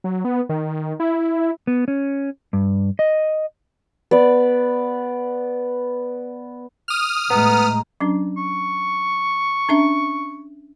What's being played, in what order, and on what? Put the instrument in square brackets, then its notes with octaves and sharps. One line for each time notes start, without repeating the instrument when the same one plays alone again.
[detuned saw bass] F#3
B3
D#3
E4
[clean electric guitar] B3
C#4
G2
D#5
[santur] B3 D5
[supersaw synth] D#6 F6
[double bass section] A2 G#3 A3 [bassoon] B3 [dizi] A#5
[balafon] F#3 C#4 D4
[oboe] C#6
[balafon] C#4 D4 E5